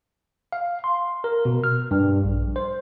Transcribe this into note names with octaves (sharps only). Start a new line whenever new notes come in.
F5
C6
A#4
B2
F6
G2
A#1
C5